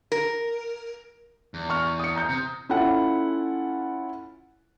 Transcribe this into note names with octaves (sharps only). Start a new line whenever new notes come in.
A#4
E2
C#6 F6
D#6 C#7
A#5 G6
C3
C#4 E4 F4 A4 F#5